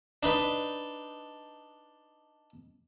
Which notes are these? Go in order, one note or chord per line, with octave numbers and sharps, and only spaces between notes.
D4 D#4 B4